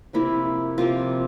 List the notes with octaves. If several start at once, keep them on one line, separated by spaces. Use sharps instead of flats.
C3 F3 A#3 E4
C3 F3 A#3 F4